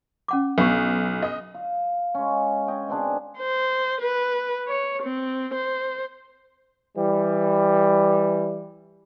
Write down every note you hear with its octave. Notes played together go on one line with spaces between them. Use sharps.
C#4 F#5 D6
B1 D4 C#6
D#5
F5
G#3 C#4
D#5 G5 G#5
B2 C4 D4 G#4
C5
B4
C#5
C4
C5
E3 G3